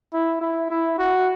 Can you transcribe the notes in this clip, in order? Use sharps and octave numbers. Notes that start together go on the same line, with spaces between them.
E4
E4
E4
F#4